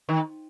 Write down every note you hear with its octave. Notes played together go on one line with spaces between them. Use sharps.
D#3